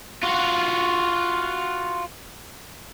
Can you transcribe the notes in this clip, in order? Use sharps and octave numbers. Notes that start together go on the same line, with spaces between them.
F4 F#4